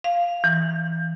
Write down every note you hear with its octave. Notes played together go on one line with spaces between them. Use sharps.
F5
E3